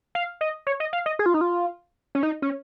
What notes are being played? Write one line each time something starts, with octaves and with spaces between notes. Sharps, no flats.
F5
D#5
C#5
D#5
F5
D#5
G#4
F4
D#4
F4
C#4
D#4
C#4